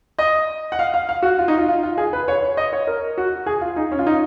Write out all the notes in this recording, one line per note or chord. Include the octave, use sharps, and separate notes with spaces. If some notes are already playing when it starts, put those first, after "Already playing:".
D#5
F#5
F5
F5
F5
F#4
F4
D#4
F4
F4
F4
G#4
B4
C#5
C#5
D#5
C#5
A#4
F#4
G#4
F4
D#4
C#4
F4
D#4